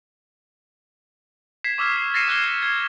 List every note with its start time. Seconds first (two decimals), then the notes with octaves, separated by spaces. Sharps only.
1.64 G#6 B6 C7 E7
1.78 C#6 D6 E6 F6 G#6
1.97 C7
2.14 A6 A#6 C7 C#7 D#7 E7
2.28 D6 F6 F#6 G#6 E7 G7
2.63 G#6